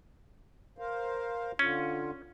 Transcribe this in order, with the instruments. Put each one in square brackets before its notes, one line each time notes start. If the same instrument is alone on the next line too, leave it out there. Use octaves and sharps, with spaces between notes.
[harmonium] A#4 C5 F5
[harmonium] D3 F4 [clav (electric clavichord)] C#4